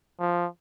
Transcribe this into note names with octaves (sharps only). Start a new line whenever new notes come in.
F3